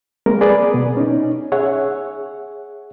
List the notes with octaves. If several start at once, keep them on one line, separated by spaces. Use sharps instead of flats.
G#3 A#3 C4 A#4
G#4 B4 D5
B2 B3
C#4 D#4
G#4 C#5 E5 F#5